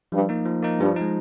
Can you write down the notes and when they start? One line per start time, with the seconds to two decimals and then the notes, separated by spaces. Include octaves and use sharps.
0.12 G2 F3
0.29 A#3 D#4
0.46 F3
0.62 A#3 D#4
0.79 G2 F3
0.96 G#3 D#4